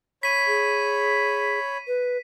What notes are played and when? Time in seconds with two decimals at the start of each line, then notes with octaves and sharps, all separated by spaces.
0.23 C#5 B5 B6 D#7
0.47 G#4
1.87 B4